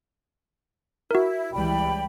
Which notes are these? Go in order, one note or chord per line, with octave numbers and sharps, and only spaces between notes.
E4 F#4 A#4
C#2 E3 G3 D5 G5 B5